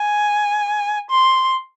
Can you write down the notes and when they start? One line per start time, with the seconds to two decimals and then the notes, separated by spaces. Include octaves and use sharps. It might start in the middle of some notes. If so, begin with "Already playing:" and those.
Already playing: G#5
1.10 C6